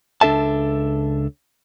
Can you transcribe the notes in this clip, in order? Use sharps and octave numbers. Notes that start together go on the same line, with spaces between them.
C#2 D4 A4 E5 A5